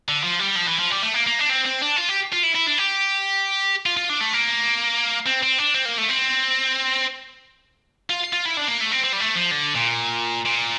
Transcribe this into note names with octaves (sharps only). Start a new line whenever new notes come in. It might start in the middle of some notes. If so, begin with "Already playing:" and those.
D3
F3
G3
F3
E3
F3
G3
A3
A#3
A#3
D4
C4
C4
D4
F4
G4
F4
E4
E4
D4
G4
F4
F4
D4
A3
A#3
C4
C4
D4
C4
A#3
A3
C4
F4
F4
E4
D4
A#3
A3
C4
C4
G3
A3
F3
D3
A#2
A#2